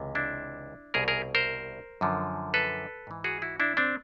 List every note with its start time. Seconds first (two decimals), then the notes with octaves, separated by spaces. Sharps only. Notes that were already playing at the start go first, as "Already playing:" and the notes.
Already playing: C#2 C3 E3
0.15 D4 E4
0.94 C2 B2 G#4 A#4
1.08 G#4 A#4
1.35 A#4 C5
2.01 F#2 D3 F3
2.54 A4 B4
3.07 G#2 E3
3.24 F#4 G#4
3.42 E4 F#4
3.60 D4 E4
3.77 C4 D4